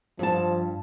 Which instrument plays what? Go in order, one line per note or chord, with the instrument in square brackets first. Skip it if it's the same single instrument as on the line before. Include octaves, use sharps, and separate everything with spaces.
[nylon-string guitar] G2 A5 [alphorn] F3